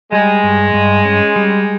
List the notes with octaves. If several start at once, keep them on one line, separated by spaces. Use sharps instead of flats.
G3 G#3
G2
G2
C#4
G3